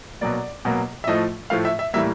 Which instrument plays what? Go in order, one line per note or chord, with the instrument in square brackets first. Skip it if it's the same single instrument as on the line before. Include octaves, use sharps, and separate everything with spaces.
[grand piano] B2 F#3 A#3 D5
B2 F#3 A#3
E5
A2 F3 A3 D#5
A2 F3 A3 F5
E5
E5
A2 E3 G3 A#3 E5